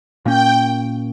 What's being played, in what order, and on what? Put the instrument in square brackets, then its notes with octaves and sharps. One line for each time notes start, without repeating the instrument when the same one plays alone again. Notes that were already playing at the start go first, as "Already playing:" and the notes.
[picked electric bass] A#2 A#3 C#4 [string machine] G5